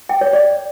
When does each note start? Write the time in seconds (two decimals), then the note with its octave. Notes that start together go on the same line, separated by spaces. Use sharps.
0.09 G5
0.21 C#5
0.33 D5